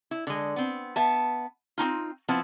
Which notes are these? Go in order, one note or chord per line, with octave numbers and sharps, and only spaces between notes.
E4
D3 G#3
B3 C4
B3 E5 A5
C4 C#4 D#4 F4
F3 B3 C4 E4